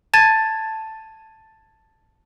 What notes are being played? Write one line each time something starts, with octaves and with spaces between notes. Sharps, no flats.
A5 G#6 A6 D#7